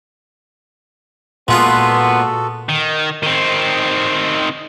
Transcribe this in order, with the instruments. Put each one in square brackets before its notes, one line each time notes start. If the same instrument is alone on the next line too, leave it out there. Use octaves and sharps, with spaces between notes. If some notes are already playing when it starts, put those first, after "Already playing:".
[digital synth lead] A#2 [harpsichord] G#3 F4 F5 [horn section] B3 [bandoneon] F#4 A4
[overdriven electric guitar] D#3
D#3 C4